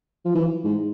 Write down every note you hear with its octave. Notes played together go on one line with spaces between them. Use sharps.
F3
E3
G#2